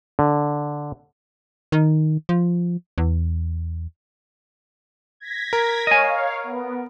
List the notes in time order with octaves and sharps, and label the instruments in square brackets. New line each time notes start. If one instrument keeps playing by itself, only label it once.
[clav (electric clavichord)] D3
[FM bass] D#3
F3
E2
[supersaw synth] G#6 A#6 B6
[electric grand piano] A#4
[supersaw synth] C#5 F5 [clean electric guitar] D#5 G#5
[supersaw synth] B3